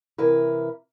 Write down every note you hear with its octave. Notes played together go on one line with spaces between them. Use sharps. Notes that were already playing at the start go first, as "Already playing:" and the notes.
C3 E3 E4 A#4 B4